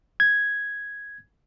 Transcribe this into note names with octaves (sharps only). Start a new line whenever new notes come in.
G#6